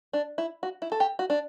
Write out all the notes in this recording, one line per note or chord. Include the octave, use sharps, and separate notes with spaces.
D4
E4
F#4
E4
A4
G4
F#4
D4